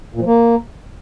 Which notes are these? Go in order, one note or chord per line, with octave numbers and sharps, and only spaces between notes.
A#2
F3
A#3